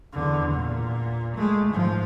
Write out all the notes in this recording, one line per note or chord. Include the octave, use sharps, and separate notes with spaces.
E2 D3
A#2
G#3 A3
G#2 F3